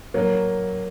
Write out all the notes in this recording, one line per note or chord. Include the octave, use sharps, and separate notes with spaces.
F#3 A#3